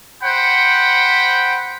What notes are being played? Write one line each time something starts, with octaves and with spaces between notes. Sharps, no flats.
C5 F#5 G5 B5